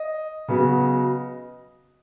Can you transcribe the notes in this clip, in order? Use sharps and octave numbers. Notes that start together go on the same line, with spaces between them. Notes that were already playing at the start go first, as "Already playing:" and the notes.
Already playing: D#5
C#3 F#3 B3